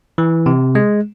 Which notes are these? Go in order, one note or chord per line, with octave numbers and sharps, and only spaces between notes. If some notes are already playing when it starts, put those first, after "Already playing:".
E3
C3
G#3